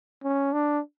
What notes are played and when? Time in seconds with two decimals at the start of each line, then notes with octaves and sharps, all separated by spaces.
0.24 C#4
0.53 D4